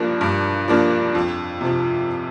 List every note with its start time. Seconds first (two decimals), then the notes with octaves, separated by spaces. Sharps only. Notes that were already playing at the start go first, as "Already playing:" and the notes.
Already playing: G2 F3 A#3 D4
0.21 G2
0.68 F3 A#3 D4
1.15 F2
1.61 C3 F3